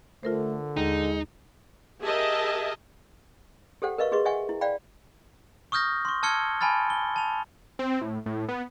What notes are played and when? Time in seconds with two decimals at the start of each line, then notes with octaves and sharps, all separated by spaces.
0.23 D3 A3 F4 A#4 C5
0.77 D#2 G#3 D#4
2.02 G4 G#4 A#4 D#5 E5 A5
3.82 G4 A4 C5 F#5 G5
3.98 A#4 B4 D#5 F5 C#6
4.12 F#4 G#4 B4 D#5 C#6
4.25 D#5 E5 F#5 G#5 C#6
4.49 E4
4.61 D5 F5 G5 B5
5.72 C#6 D#6 F6 G6 A#6
6.05 C6 C#6
6.23 A5 E6 F6 G#6 C#7 G7
6.61 G#5 A5 B5 F6 A6
6.90 G7
7.16 A5 F7
7.79 C4
8.01 A2
8.26 A2
8.49 B3